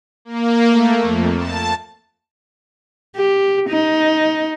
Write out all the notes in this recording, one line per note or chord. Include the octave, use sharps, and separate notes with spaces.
A#3
A3
F2
A5
G4
D#4